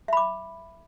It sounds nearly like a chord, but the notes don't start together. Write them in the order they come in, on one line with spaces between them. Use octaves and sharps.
E5 B5 D6